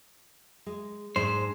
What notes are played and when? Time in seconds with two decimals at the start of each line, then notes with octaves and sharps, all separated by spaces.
0.66 G#3
1.16 G#2 G#3 D4 C5